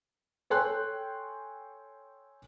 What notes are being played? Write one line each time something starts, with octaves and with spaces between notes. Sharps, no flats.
A4 C#5 G5 G#5 C6 F#6